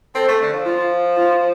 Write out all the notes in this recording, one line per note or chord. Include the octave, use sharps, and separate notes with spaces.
C4 A4
A3
D3
F3
F4
F4